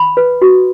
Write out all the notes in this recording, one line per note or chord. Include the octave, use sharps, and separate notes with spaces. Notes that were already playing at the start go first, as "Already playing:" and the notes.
Already playing: B5
B4
F#4